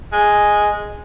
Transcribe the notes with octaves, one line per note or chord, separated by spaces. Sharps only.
G#3